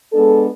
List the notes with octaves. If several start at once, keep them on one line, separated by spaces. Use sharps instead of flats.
G#3 B3 D4 A4